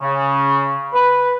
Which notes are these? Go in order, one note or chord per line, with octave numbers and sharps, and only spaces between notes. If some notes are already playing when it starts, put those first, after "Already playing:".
C#3
B4